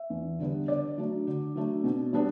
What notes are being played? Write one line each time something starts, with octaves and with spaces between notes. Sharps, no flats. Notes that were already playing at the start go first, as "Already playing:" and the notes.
Already playing: E5
E2
D3 G3 B3
D3 D5
F#3 A3 D4
D3
F#3 A3 D4
B2
G3 B3 D4